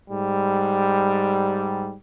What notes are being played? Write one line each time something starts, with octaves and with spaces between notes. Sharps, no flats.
G#2 G3